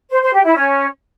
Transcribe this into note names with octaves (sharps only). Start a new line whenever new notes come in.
C5
C5
G4
E4
C#4